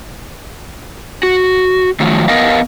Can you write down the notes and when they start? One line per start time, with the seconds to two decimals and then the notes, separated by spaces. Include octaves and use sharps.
1.23 F#4
2.00 D#3 F3 F#3 A3
2.28 B3 A#4 D#5 F5